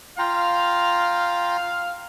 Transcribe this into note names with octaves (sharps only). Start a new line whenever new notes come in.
F4 F5 G5 A#5